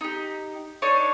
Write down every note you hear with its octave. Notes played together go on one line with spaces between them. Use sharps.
D#4 G4
D4 D#4 C#5